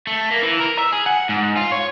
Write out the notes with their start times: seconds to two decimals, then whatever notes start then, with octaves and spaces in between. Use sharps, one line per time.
0.07 A3
0.31 A#3
0.43 E3
0.60 A#4
0.79 E5
0.92 G#4
1.06 F#5
1.29 G#2
1.57 F4
1.72 C#5